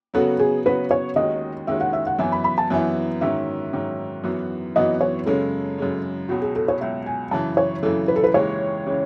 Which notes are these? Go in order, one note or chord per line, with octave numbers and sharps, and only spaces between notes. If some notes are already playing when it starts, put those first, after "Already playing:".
C#3 F#3 B3 F#4 A4
G#4
C#3 F#3 B3 F#4 B4
C#5
D#2 D#3 G#3 C#4 F#4 D#5
D#2 D#3 G#3 C#4 F#4 E5
F#5
E5
F#5
F#2 E3 B3 E4 G#5
B5
B5
A5
F#2 E3 B3 E4 G#5
G#2 D#3 F#3 C#4 E5
G#2 D#3 F#3 C#4
F#2 E3 B3 F#4
F#2 E3 B3 F#4 D#5
C#5
F#2 C#3 G#3 C#4 A4
F#2 C#3 G#3 C#4
C#2 B2 F#3 F#4
G#4
A4
C#5
C#2 B2 F#3 E5
G#5
F#2 C#3 E3 A5
C#5
F#2 C#3 E3 A4
B4
A4
B4
D#2 C#3 E3 G#3 C#4 C#5
C#3 E3 G#3 C#4